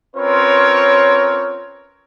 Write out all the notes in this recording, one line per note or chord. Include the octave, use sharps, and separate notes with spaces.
C4 C#4 F4 A#4 B4 C#5